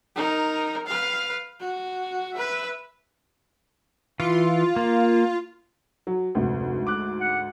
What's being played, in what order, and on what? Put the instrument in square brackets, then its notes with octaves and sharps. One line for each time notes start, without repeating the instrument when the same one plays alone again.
[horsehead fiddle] D#4 A#4
B4 F5
F#4
B4 E5
[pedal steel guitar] E3 [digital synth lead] F4
[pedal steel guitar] A#3
[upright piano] F#3
[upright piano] F1 [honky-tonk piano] D2 G#2
[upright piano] D6 F#6
[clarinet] F#5